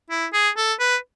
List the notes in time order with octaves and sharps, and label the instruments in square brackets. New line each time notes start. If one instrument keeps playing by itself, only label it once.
[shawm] E4
G#4
A4
B4